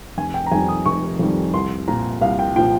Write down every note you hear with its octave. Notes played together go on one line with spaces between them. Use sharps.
F1 G#5
G5
A#5
F2 D#3 G3 G#5
D#6
F1 C#6
F2 D#3 G3
C2 C6
A#2 F3 A#5
C2 F5
G5
A#2 F3 G5